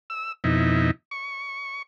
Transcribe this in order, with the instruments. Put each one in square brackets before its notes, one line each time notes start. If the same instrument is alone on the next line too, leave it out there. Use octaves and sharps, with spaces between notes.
[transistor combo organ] E6
F2 B2 D#4 E4
C#6